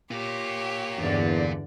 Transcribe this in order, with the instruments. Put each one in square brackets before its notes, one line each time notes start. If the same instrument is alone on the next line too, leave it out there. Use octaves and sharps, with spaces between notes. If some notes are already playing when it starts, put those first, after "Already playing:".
[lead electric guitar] A#3 F4 [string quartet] G4 C#5
[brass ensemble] E2 [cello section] G2 D3 D5